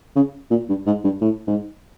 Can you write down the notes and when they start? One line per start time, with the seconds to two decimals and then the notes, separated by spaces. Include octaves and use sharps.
0.16 C#3
0.51 A#2
0.69 G2
0.86 G#2
1.04 G2
1.21 A2
1.47 G#2